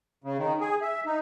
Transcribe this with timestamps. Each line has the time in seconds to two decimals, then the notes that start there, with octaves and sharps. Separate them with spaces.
0.24 C#3
0.38 D#3
0.61 G#4
0.82 E5
1.06 D#4